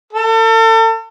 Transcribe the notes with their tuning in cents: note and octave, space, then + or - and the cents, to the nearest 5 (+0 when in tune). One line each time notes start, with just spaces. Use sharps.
A4 +40